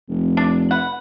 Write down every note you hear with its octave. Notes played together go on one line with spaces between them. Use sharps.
F1
D4
B4 F#5